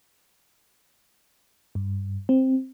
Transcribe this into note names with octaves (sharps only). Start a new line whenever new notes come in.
G2
C4